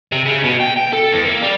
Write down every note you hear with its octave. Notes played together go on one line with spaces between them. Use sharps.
C3
C#3
B2
G5
G5
A4
E2
A#3
G3